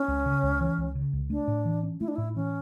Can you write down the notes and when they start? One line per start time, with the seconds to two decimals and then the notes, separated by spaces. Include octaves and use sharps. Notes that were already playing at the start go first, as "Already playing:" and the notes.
Already playing: C#4
0.08 C#2
0.26 C#3
0.43 C#2
0.61 E3
0.78 C#2
0.95 C#3
1.13 C#2
1.30 A3 D4
1.48 A2
1.65 E3
1.83 C#4
2.01 A3 E4
2.08 D4
2.16 A2 E4
2.36 E3 C#4